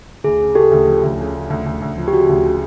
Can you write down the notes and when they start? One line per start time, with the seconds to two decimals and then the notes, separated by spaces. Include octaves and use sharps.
0.24 D2 G#4
0.40 C#3
0.55 C#3 G4 A4
0.71 D2
0.88 F3
1.03 D2
1.19 C#3
1.35 C#3
1.50 D2
1.66 D2
1.82 D2
1.97 F3
2.08 G4
2.13 C#3 F#4
2.29 D2
2.45 C#3